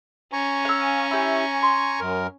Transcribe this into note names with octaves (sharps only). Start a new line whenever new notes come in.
C#4 G#5 A#5 C#6
F5 E6
E4 G4
C6
F#2 A#4